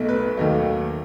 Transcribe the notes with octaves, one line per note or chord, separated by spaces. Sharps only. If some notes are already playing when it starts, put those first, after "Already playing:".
Already playing: B1 B2 A3
B4
D#2 D#3 F#3 A3